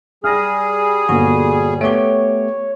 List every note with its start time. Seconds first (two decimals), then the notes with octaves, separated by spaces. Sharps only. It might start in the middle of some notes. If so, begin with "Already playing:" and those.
0.24 G3 G#4 D#6 F6 A#6
1.09 G1 A#2 D3 F#4
1.81 A3 B3 G4 C#5 D7 G7